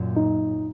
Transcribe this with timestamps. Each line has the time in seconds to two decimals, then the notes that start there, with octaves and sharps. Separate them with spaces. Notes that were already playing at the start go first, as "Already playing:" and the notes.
Already playing: F#2 A#2
0.16 D#4